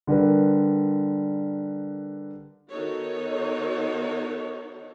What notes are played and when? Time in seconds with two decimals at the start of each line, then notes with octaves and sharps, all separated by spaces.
0.07 D3 G3 A#4 B4
2.70 D#3 B3 D#4 F#4 A4 C#5